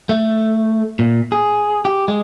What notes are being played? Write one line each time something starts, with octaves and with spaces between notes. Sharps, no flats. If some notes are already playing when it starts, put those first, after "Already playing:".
A3
A#2
G#4
G4
G#3